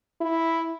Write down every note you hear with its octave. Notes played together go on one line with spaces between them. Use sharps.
E4